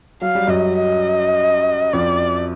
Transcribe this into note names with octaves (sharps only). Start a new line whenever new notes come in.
F#3 F5
G3
F#2 F#3 D#5
D#5
F2 F3 D5